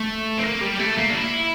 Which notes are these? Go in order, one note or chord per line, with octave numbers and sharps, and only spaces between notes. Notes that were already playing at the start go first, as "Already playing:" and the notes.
Already playing: A3
C4
A#3
G3
A3
A#3
D4
E4